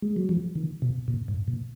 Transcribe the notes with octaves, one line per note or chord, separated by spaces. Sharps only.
G#3
F#3
F3
D#3
B2
A#2
G#2
A#2